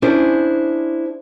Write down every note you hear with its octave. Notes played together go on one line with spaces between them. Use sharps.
C#4 D4 E4 G#4 C5